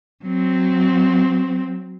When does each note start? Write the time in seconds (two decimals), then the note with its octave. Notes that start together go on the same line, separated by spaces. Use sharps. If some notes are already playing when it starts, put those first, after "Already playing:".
0.24 F#3 C4